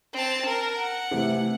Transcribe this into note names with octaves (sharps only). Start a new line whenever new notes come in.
C4 A5
A#4
F#5
C3 E3 A3